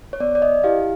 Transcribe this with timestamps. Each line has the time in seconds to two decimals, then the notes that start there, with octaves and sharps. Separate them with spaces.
0.13 C#5
0.20 B3 D5
0.35 D5
0.42 D#5
0.64 E4 G4 F5